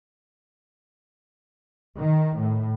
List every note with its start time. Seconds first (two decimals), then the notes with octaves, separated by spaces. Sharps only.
1.98 D#3
2.37 A2